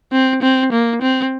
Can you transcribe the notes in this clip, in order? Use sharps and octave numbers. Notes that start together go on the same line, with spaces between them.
C4
C4
A#3
C4